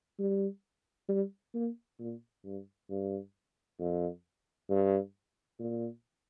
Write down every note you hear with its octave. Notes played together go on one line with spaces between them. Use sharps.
G3
G3
A#3
A#2
G2
G2
F2
G2
A#2